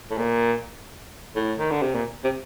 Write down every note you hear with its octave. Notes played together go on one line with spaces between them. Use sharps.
A2
A#2
A2
D#3
D3
C3
A#2
C3